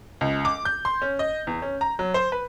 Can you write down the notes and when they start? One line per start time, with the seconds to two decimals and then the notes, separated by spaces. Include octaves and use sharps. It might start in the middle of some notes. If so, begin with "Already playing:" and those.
0.21 C#2
0.45 D6
0.65 G6
0.85 C6
1.02 C#4
1.19 D#5
1.47 E2
1.62 C#4
1.81 A#5
1.99 F#3
2.14 C5
2.32 B4